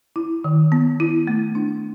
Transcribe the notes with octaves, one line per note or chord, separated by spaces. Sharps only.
E4
D#3
B3
E4
A3
D4